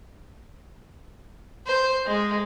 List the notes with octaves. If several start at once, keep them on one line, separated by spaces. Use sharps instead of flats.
C5
G#3